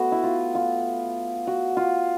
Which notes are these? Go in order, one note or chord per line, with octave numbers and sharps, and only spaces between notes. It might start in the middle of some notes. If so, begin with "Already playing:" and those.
Already playing: A3 B3 F#4
E4
F4
F4
F#4
F4